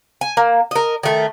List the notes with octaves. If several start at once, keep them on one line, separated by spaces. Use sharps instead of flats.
G#5
A#3
A#4 D#5
D#3 A3